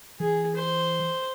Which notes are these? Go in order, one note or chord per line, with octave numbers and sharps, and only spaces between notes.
E3 G#4
C5